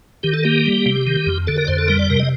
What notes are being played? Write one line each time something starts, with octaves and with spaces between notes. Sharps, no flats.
D#3 G4
A4
A#3 G4
G3
C3
D#3
F2
D3 A4
A#4
D5
F2 C5
A4
G3 A#4
D5
C3 A#4
D#5